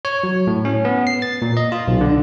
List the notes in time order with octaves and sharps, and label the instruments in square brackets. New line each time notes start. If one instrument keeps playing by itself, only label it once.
[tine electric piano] C#5
F#3
A2
C#4
B3
C7
A6
A#2
D#5
F4
B1
D3